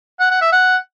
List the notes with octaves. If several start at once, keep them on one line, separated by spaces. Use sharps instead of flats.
F#5
F#5
E5
F#5